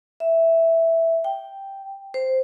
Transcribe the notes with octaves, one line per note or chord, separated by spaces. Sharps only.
E5
G5
C5